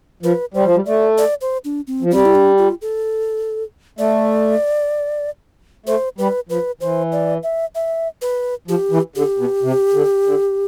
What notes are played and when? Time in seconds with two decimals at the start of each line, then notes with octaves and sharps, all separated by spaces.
0.23 F3 B4
0.54 G3 C5
0.65 F3
0.75 G3
0.86 A3 D5
1.18 D5
1.41 C5
1.65 D4
1.87 C4
2.02 F3
2.11 G3 C4
2.25 E4
2.35 D4
2.58 F4
2.82 A4
3.98 A3 D5
5.86 A3 C5
6.18 G3 B4
6.49 F3 B4
6.81 E3 C5
7.12 D5
7.43 E5
7.75 E5
8.22 B4
8.68 F3 G4
8.91 E3
9.15 D3 G4
9.38 B2
9.63 C3
9.93 D3
10.26 D3